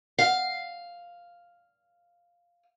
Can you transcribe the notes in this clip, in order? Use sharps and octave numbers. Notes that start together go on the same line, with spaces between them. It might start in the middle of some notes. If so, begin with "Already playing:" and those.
F5 F#5